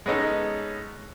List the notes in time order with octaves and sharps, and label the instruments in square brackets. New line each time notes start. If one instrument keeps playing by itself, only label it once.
[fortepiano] G#3 B3 C#4 D#4 A4